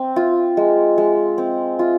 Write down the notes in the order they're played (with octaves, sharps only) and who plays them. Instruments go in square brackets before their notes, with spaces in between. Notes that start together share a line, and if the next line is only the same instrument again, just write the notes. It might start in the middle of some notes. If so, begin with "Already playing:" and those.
Already playing: [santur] C4
F4
G#3
G#3
C4
F4